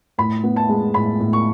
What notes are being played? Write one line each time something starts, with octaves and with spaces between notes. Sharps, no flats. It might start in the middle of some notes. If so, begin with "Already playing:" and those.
A2 B5
B3
A5
G#3
A2 B5
A2
C#6